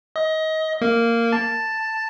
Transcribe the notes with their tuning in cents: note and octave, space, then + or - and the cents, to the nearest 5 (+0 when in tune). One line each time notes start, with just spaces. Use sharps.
D#5 +25
A#3 -10
A5 +5